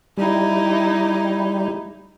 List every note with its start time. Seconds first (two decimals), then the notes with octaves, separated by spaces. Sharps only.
0.17 G3 D#4 E4